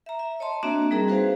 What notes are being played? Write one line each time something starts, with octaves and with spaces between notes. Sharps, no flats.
E5 A#5
E5
C#5 D#5 A5 C6
A#3 C4 D4 F#4 E5 A#5
G3 C4 D#4 G#4 A#4 A#5
F#4 G#4 B4 C5 F5